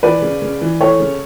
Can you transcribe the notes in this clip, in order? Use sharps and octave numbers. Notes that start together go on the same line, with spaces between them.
E3 B4 D5
C#3
C#3
E3
E3 A4 C#5
C#3